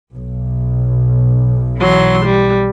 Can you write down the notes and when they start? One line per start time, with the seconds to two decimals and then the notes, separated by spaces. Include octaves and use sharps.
0.14 B1
1.79 E3 F#3 C6
2.25 G3